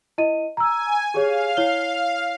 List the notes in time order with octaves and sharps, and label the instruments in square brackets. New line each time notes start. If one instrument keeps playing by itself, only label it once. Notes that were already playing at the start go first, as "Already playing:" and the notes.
[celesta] E4 D#5 D#7
[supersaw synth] G#5 [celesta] A#5 E6
[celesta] G4 G#4 C#5 [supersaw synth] F5
[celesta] E4 C#5 G7